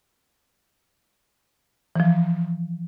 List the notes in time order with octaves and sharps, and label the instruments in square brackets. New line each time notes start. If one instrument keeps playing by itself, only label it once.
[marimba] E3 F3